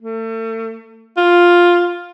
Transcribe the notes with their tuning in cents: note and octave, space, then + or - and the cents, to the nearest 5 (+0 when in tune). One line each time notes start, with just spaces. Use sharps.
A3 +35
F4 +5